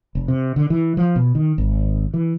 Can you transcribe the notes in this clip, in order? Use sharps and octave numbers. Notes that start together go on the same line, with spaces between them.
F1
C3
D3
E3
F3
B2
D#3
G#1
E3